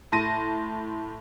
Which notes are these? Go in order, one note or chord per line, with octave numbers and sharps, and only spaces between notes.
A2 A5 C6 A#6 D#7